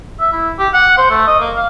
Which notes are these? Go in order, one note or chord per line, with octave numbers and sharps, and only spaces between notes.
E5
E4
G4
F#5
C5
A3
D#5
A#3
F5